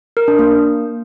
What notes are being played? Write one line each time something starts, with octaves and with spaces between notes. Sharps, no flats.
A#4
D4
A#3